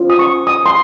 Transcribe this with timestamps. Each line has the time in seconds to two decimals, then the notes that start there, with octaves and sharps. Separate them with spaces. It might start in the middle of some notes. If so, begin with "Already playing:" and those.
Already playing: C#4 F4 C5
0.10 D#6
0.19 C#6
0.47 D#6
0.66 C6